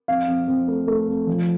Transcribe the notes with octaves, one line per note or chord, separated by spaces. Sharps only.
F2 F5
F2
F2
A3
A3
F2
F3